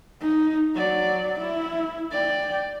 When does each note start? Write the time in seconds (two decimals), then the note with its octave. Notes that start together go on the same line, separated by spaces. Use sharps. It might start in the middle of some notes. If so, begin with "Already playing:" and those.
0.21 D#4
0.75 F#3 D5
1.40 E4
2.12 D5 G5